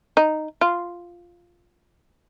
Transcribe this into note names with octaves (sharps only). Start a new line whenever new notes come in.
D#4
F4